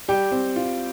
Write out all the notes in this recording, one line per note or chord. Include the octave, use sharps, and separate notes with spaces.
G3 G4 G5
C4
F4